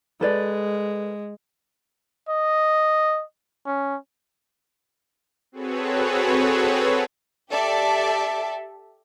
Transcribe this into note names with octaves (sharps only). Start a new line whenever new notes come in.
G#3 A4 B4 D5
D#5
C#4
C4 F#4 G#4 A4 B4 C#5
G4 A4 D5 E5 A5